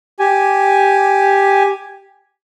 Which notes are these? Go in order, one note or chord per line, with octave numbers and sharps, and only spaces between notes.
G4 G#5